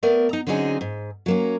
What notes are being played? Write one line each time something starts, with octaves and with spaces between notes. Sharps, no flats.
A3 B3 A#4 D5
D#4 A#5
D3 F#3 C4 C#4 D#4 G#4
G#2
F#3 A#3 C#4